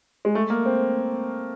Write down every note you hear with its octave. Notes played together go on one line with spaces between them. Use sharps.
G#3
A3
A#3
C4